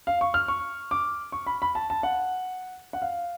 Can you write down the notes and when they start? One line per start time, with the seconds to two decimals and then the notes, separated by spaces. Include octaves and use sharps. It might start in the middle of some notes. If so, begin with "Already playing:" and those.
0.07 F5
0.21 C#6
0.34 F6
0.48 C#6
0.91 D6
1.32 C#6
1.46 B5
1.62 B5
1.75 A5
1.90 A5
2.03 F#5
2.93 F#5
3.02 F5